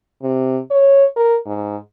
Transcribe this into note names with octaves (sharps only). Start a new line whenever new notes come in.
C3
C#5
A#4
G#2